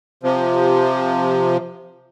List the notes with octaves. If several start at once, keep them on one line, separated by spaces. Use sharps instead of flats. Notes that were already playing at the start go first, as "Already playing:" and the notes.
C3 F3